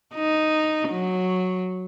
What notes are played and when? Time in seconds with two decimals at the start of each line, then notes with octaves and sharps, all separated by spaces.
0.14 D#4
0.90 F#3